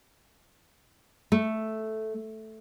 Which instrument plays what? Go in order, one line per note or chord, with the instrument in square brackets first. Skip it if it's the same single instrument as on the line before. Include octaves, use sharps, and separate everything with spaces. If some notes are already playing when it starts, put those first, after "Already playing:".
[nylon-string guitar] A3